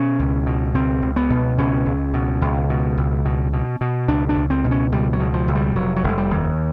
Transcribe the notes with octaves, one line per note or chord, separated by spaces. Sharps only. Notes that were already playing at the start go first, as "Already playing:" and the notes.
Already playing: B2 C#4
C#2
B2
C#2 C4
C#2
B3
B2
C#2 C#4
C#2
B2
C#2
B2
C#2
B2
B2
B2
C#2 D4
D4
C#2
C4
B2
C#4
C#2 G3
F#3
B2
F3
C#2
G3
F1 F#3
F#3
F1 G#3
G3
D#2